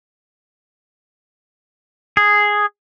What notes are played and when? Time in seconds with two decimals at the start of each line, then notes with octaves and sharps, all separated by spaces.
2.17 G#4